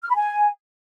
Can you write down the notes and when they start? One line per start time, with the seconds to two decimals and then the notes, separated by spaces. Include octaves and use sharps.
0.03 F6
0.09 B5
0.15 G#5